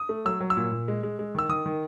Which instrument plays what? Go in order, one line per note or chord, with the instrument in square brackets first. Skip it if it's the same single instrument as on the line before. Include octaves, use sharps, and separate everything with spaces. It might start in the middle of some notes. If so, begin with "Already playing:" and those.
Already playing: [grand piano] D#6
A3
F#3 E6
F#3
E6
A#2
A#2
G#3
G#3
G#3
D#3 E6
D#3 D#6
D#3